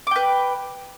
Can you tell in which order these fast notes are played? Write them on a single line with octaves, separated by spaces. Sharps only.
D6 G5 B4